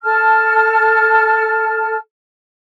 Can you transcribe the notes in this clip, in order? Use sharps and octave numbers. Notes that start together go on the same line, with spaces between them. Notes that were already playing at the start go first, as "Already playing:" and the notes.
A4 A5 F6